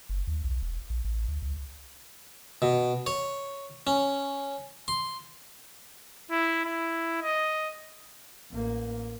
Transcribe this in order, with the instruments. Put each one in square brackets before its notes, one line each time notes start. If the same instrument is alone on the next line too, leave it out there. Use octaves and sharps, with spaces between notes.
[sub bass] F#1
D#2
B1
E1
A#1
A1
D2
C#2
[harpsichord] B2
C#5
C#4
C6
[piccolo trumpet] E4
E4
D#5
[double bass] A1 A#3